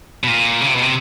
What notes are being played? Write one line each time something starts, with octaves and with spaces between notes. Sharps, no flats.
B2
A#2
C#3
C3
B2
C3